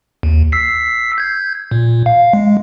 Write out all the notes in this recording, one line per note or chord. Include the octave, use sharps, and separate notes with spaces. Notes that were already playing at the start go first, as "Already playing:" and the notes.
D#2
E6 B6 C7
G6 G#6
A#2
F5
G#3